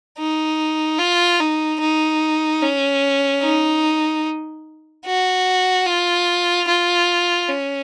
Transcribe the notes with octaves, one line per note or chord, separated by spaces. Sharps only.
D#4
F4
D#4
D#4
C#4
D#4
F#4
F4
F4
C#4